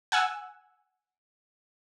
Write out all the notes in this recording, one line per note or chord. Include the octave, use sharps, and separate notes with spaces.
F#5 G#5 E6